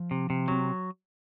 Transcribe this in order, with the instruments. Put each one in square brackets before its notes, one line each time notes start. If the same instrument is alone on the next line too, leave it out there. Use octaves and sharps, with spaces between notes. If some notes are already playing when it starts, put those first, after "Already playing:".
Already playing: [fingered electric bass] F3
[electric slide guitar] C3
C3
[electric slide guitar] F#3 [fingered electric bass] C4